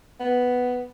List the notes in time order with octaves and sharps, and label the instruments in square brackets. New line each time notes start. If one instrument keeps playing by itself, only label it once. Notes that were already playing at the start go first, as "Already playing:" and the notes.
[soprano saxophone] B3